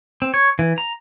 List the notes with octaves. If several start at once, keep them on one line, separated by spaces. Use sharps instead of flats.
C4
C#5
E3
A#5